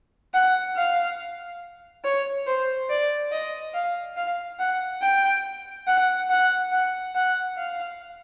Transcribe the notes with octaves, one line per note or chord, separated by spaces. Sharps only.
F#5
F5
C#5
C5
D5
D#5
F5
F5
F#5
G5
F#5
F#5
F#5
F#5
F5